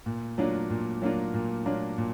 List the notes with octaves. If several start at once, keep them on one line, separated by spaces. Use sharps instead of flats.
A#2
F#3 A#3 D4 F4
A#2
F#3 A#3 D4 F4
A#2
F#3 A#3 D4 F4
A#2